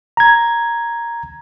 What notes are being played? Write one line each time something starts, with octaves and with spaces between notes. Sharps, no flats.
A#5 G#6